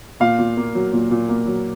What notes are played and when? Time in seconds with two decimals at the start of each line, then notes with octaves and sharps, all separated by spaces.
0.20 A#2 F5
0.39 A#2
0.57 A#3
0.75 F#3
0.93 A#2
1.11 A#2
1.29 A#3
1.47 F#3